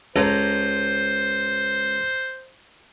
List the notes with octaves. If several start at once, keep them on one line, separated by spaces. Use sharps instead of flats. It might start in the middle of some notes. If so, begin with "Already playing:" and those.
C#2 A4 C5 A#5